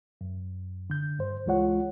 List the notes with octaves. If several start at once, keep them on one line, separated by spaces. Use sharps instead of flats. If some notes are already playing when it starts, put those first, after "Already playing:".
F#2
D3 G6
G2 C5
C#2 E3 G#3 F4 C#5 F#5